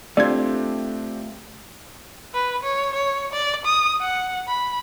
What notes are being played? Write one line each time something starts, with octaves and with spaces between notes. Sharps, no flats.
A3 C4 D4 F4 G4 D5 G#6
B4
C#5
C#5
D5
D#6
F#5
B5